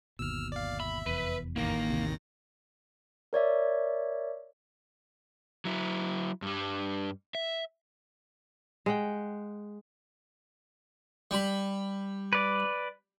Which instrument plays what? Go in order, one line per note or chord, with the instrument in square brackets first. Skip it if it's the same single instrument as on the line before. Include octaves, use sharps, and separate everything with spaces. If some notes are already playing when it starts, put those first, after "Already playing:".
[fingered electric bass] G1 D#2 B2 [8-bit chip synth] E6 F6
[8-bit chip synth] D5 F5
[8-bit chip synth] E5 [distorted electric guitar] B5
[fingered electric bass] F1 E2 [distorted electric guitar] B4
[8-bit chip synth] A1 D#3 A#6 [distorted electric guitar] A#3
[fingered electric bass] D#2 C3
[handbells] A#4 C#5 D5 E5
[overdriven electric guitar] F#3 E4
G2 G3
E5
[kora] G#3 F#5 G5
[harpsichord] G3 B5
[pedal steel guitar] B4 D5